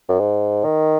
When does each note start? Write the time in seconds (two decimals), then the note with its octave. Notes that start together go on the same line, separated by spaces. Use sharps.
0.09 F#2
0.20 G#2
0.64 D#3